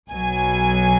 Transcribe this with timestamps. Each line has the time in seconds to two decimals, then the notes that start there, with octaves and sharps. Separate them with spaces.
0.10 B1 B2 F#3 G#5